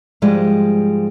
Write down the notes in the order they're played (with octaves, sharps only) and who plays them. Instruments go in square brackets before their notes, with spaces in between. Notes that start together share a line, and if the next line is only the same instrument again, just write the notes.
[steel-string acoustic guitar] G#2 F3 G3 G#3